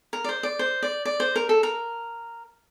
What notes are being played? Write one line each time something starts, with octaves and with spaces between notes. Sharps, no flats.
A#4
D5
C5
D5
C5
D5
D5
C5
A#4
A4
A#4